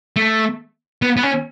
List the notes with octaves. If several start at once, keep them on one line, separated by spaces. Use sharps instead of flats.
A3
B3
B3
C#4